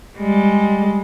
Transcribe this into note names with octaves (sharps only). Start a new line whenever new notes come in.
G3 G#3